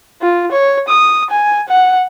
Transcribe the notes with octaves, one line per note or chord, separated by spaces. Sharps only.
F4
C#5
D#6
G#5
F#5